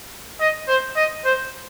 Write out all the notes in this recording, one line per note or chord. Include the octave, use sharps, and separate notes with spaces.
D#5
C5
D#5
C5